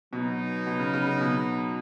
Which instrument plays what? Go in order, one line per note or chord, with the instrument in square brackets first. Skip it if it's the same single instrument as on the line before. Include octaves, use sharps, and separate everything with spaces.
[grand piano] B2 [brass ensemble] F#3 B3 D#4
[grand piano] B2
C#3
C#3
C#3
B2